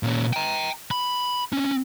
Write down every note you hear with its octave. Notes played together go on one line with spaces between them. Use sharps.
A#2 C#4
G5 A#5
B5
C4 C#4